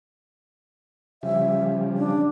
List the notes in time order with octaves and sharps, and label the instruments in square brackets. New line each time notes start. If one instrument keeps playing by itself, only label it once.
[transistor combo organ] C#3 F3 G3 [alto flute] E5
[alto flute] D4